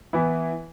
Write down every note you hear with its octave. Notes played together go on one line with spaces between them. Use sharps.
E3 B3 E4